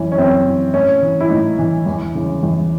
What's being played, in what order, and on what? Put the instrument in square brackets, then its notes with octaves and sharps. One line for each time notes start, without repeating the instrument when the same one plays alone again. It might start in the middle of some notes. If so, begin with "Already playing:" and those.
Already playing: [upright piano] F#2 E3 C#4
C#4
F#2 C4
E3
A2 C#4
E3
E4
A2 D#4
E3
E2
C#3 E3
E2